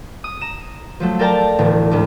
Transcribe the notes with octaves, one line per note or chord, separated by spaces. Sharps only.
D#6
A#5 E7
F3 F#3 A3
A4 A#4 D5 G5 A5 A#5
E1 A1 A2 D3
D2 G#2